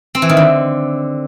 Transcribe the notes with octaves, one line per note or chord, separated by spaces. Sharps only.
C4
E3
D#3
D3